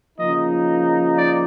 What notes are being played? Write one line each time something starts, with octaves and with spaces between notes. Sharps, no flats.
C#3 F3 A#3 D#4 D#5
D5